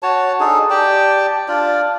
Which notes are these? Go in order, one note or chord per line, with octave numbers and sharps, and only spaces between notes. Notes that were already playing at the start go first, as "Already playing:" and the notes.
F#4 C#5 A5
D4 D#4 G#4 A4
G4 D5 G5 A5
D4 F4 D5